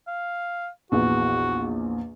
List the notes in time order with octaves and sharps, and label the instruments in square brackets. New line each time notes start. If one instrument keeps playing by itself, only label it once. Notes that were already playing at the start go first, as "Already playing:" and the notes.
[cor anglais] F5
[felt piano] A#1 E2 [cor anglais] F#4